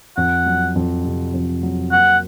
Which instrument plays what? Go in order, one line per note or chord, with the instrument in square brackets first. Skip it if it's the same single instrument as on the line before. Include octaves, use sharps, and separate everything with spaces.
[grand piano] F2 [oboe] F#5
[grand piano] F#3
F2
C3
F2
F#3
[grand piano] A#3 [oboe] F#5